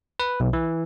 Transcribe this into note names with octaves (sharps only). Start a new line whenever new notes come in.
B4
B1
E3